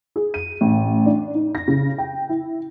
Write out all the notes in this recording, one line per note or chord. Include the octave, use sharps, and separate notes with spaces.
G#4
D#7
A1
D4
D#4
A#6
C#3
G5
E4